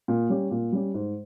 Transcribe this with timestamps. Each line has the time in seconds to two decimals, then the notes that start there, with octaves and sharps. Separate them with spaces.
0.08 A#2
0.29 G3 C#4 G4
0.51 A#2
0.72 G3 C#4 G4
0.94 G#2